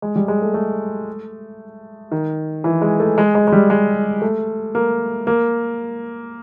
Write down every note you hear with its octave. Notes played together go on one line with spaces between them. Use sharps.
G#3
G3
G#3
A3
A3
D#3
E3
G#3
A3
G#3
G#3
G#3
G3
G#3
A3
A#3
A#3